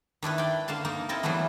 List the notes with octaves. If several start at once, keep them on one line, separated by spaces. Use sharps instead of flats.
D#3 D4 E4 B4
D5 G5
D3 A#3 F5 A5 C6
A#3 D#4 A#4
C4 E4 A4 A#4 D#5 A5
E3 F#3 G3 A3 B3